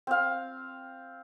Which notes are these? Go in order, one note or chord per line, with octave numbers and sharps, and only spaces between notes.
C4 F5